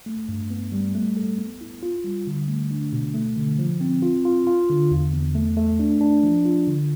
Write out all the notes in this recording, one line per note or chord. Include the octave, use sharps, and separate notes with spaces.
A3
G2
B3
G3
A3
A4
B3
E4
F4
G3
D3
A3
D4
B2
A3
D3
F3
C4
F4
F4
F4
D3
E2
E2
A3
A3
D4
D4
F3
F4
D3